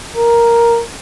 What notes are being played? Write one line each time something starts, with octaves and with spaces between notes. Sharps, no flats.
A#4